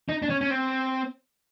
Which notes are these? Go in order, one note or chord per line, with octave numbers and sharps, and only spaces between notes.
D#4
D4
C#4
C#4
C4